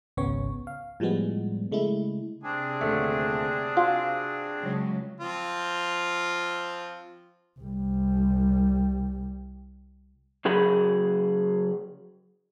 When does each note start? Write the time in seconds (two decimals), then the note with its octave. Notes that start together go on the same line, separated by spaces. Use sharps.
0.17 G#1 C#2 C#3 B3 C#5 C#6
0.67 F5
1.00 A2 F3 G3 G#3 B3
1.72 C#3 G#3 A3 E4
2.43 C3 C4 D4 G#4
2.81 D#1 D3 A3
3.77 F4 F#4
4.61 C#3 F#3 G#3
5.20 F3 C4 F4
7.59 C2 G3
10.45 C#3 F#3 G#4 B5